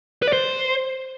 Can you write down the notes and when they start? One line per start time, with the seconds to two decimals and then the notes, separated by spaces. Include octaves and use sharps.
0.22 B4
0.28 D5
0.33 C5